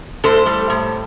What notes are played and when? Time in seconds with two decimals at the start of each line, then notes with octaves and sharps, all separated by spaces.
0.24 A2 A4 C5
0.46 G3
0.70 A2